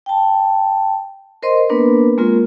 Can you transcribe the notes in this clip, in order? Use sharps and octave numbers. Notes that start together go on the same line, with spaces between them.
G5 A5
A#4 C5 D#5 C6
A#3 B3 D4 A#4 B4
G#3 A#3 C4 F4 A#4